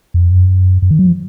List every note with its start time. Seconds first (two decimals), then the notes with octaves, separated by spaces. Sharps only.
0.14 F2
0.31 F#2
0.82 F#2
0.91 D#3
0.99 F#3
1.07 F3